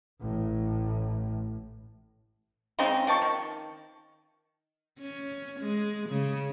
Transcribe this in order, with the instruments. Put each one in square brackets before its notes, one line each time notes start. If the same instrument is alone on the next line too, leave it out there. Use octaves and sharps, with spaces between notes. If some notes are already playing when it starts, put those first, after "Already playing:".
[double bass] A1 A2
[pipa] C#3 G#3 C4 D#4
F3 A5 C#6
D#3
[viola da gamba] C#4
G#3
C#3